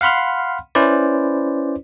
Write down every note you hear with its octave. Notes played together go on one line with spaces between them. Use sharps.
F5 F#5 B5 C6 F6
C#4 E4 B4 C5 D5